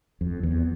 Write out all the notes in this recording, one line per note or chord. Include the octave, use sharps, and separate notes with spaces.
F2
E2